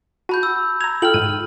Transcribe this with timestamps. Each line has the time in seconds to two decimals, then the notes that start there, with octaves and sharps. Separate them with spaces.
0.29 F#4 A5 B5 G6
0.43 E6
0.81 A#5 G#6 F7
1.02 F4 A4 G5 F6 F#7
1.14 G#2 D#7